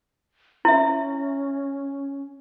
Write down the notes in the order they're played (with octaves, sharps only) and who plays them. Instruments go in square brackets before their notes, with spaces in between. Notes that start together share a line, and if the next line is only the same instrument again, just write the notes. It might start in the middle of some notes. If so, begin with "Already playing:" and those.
[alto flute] C#4 [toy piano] E4 E5